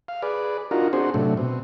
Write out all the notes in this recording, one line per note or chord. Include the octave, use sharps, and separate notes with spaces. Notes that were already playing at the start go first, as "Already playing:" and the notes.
F5
G#4 B4 D5
D4 D#4 F4 F#4 A#4
C4 D4 F#4 G#4 C5
A2 C3 F#3 A3 D4
B2 C4